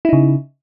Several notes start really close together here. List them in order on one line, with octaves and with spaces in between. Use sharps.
E4 D#4 C#3